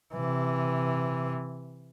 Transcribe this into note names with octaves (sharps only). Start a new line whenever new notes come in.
C3 E3